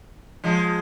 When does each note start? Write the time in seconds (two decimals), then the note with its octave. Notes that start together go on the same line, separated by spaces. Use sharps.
0.44 F3 G#3